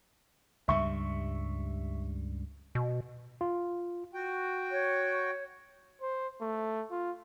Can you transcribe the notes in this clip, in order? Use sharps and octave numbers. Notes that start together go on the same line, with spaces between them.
C#2 G2 G3 E5 C#6
B2
F4
F#4 G5
C#5
C5
A3
F4